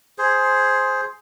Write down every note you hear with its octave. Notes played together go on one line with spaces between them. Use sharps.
G#4 C5